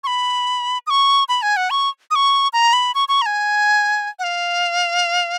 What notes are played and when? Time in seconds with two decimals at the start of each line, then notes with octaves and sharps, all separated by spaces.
0.04 C#6
0.07 B5
0.87 D#6
0.90 C#6
1.29 B5
1.42 G#5
1.57 F#5
1.70 C#6
2.11 D#6
2.15 C#6
2.53 A#5
2.73 B5
2.95 C#6
3.09 C#6
3.22 A#5
3.26 G#5
4.19 F#5
4.24 F5